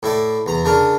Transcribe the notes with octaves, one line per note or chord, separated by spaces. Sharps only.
A2 E4 D5
E2 A#5
C#3 D4 A#4